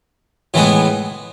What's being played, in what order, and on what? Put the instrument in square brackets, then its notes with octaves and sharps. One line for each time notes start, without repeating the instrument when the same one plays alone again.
[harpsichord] A2 E3 G#3 B3